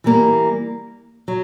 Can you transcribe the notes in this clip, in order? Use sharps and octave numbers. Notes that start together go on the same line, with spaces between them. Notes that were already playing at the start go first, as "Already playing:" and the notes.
E3 G3 A#3
F#3